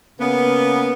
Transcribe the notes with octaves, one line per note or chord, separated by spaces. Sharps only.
C#3 A#3 B3